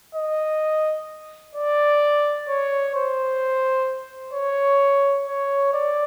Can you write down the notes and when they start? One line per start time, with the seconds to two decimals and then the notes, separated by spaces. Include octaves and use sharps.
0.15 D#5
1.55 D5
2.48 C#5
2.95 C5
4.34 C#5
5.27 C#5
5.73 D5